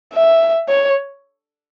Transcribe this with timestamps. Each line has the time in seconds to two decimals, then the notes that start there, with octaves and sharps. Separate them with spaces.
0.13 E5
0.69 C#5